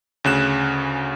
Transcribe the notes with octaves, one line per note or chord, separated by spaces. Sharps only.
D2 C#3 F#6 E7